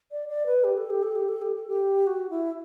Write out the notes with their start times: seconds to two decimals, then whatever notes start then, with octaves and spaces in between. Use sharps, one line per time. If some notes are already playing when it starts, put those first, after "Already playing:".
0.12 D5
0.29 D5
0.46 B4
0.64 G4
0.77 A4
0.90 G4
1.03 A4
1.16 G4
1.29 A4
1.42 G4
1.55 A4
1.68 G4
2.07 F#4
2.30 E4